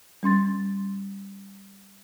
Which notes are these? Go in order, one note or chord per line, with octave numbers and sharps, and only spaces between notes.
G3 C#4 C6 A6